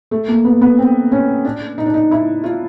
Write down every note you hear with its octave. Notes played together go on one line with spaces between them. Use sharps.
A3
A#3
B3
B3
C4
C#4
D4
D#4
D4
D#4
E4
F4